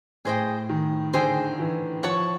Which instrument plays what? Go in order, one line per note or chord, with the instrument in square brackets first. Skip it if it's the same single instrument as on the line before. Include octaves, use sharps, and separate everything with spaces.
[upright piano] A2 [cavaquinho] G#4 C5 D#5 G5
[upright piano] D#3
[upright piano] D3 [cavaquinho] G#4 C5 D#5 G5
[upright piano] E3
[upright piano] F3 [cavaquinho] C#5 F#5 A5 C#6